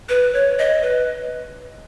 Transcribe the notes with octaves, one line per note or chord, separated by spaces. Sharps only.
B4
C#5
D#5
B4